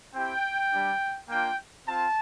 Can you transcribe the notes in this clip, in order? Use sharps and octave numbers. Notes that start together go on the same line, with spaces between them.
C4 E4 G4 G5
G3 D4 G4
A#3 D4 F4 G5
C4 F4 A5